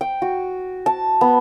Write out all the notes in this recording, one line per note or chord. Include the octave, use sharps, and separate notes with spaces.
G5
F#4
A5
B3